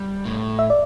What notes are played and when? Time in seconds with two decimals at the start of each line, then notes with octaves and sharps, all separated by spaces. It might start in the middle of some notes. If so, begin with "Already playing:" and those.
Already playing: G3
0.26 A2
0.59 E5
0.70 D5